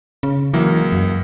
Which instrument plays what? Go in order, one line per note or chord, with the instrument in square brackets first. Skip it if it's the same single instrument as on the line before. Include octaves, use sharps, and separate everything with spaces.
[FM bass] C#3
[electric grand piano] C#2 F#3 A#3 [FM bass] E3
[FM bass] F#2